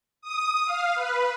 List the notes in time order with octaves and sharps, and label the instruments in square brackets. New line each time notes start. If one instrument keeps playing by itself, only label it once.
[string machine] D#6
F5
B4